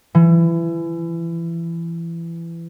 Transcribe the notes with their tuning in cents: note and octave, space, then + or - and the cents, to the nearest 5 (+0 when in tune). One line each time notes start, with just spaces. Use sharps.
E3 +25